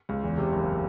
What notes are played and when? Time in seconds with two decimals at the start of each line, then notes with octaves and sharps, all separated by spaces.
0.09 C#2
0.24 E2
0.38 C3
0.53 F#1